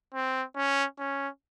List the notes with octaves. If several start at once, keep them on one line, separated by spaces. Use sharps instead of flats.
C4
C#4
C#4